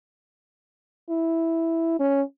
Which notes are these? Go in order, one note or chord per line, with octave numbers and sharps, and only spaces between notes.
E4
C#4